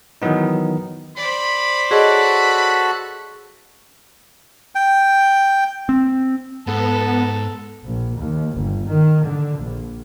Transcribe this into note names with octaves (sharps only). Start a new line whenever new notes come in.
D#3 E3 F#3 B3 D#4
C5 D5 B5
F#4 G#4 A4 C#5 D#5 B5 F#6
G5
C4
G#2 B3 A4
A#1
D#2
G1
D#3
D3
A#1